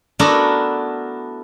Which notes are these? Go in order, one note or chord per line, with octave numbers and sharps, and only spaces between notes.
A3 B3 D4 E4 F#4 A#4